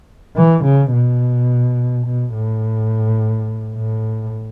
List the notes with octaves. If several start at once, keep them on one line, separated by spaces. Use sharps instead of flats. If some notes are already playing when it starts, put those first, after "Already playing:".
E3
C#3
B2
B2
A2
A2